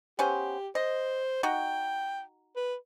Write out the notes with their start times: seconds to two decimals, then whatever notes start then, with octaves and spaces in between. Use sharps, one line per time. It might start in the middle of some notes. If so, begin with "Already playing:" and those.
0.19 B3 C#4 G4 C5
0.75 C5 D#5
1.43 D#4 F#4 G5
2.56 B4